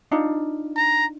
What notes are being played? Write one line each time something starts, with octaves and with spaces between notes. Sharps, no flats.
D4 D#4 F4
A#5